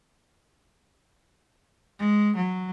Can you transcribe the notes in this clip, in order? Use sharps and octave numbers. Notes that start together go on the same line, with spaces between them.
G#3
F#3